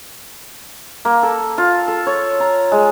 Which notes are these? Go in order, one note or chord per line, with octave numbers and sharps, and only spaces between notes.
A#3
A4
F4
A4
C#5
A#5
G#3